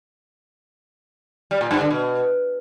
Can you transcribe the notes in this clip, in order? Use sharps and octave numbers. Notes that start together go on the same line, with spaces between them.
G3
A#2
G2
D3
B2